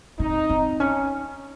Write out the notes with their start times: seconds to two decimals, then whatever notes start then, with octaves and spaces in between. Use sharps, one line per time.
0.19 C4 D#4
0.50 C4
0.80 C#4